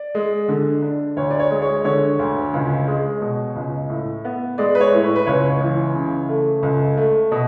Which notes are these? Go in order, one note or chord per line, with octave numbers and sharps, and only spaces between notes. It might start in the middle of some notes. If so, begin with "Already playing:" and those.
Already playing: D5
G#3
D3
D4
D2 C#5
D5
C#5
G#3
C#5
D3 C#5
D2
C#2
G#3
B2
C#2
A2
B3
G#3 D5
B4
C#5
A2
B4
B4
C#2 C#5
E3
C#3
A3
C#2
A3
B2